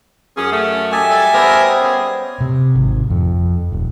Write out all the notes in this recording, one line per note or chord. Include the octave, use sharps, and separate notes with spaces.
F#2 C#4 G#4
A3 C#4
G4 D#5 E5 G#5 A5
G3 A4
B3 G4 A#4 C5
C#4 G#4
C3
G#1
F2
D#1